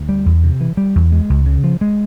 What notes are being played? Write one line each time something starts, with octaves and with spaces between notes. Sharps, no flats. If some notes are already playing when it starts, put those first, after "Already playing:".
Already playing: D2
G3
E2
C3
E3
G3
E2
G#3
C#2
C#3
F3
G#3